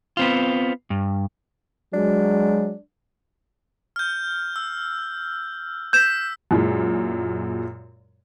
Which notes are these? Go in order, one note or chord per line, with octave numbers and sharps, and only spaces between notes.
B3 C4 F4
G2
F#3 G#3 D4
F6 G6
E6
E6 G6 B6 E7
F#2 A#2 E3 G#3